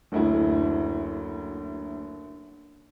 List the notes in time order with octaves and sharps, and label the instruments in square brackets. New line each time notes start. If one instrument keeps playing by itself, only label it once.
[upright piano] F#1 D2 E4